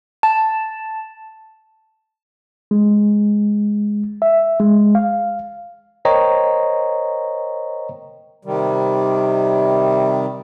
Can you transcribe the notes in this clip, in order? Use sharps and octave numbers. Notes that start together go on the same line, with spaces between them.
A5
G#3
E5
G#3
F5
A#4 C5 C#5 D#5 G5 A#5
C3 D#3 G3